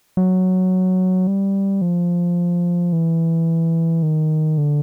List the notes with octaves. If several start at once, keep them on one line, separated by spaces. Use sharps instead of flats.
F#3
G3
F3
E3
D#3
D3